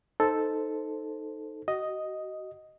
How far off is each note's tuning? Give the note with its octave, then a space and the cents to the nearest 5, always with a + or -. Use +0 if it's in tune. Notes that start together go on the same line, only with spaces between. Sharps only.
D#4 +0 A4 +0 C5 -5
F#4 +30 D#5 +0